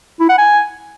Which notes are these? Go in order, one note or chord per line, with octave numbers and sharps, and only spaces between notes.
E4
F#5
G#5